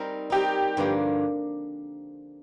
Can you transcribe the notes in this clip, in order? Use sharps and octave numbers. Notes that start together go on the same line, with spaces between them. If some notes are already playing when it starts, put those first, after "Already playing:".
Already playing: G3 C4 D#4 A#4 D#5
G3 C4 D#4 G4 A#4 D#5
G2 D3 F3 A#3